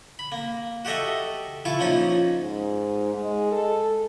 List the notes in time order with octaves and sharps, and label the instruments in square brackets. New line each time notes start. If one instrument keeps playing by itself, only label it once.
[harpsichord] B5
A#3
F#4 G4 A4 D#5 E5
E4 F4 A5 C#6
F3 A#3 C#4 D#4
[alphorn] G#2
G#3
A4